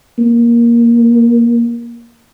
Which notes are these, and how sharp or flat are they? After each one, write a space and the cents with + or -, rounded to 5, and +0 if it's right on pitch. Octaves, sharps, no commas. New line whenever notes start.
A#3 +15